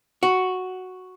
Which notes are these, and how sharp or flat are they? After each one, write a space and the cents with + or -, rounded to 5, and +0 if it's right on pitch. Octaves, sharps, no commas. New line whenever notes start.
F#4 +0